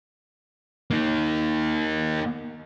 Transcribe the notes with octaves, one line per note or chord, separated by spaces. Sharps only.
A#3 D#4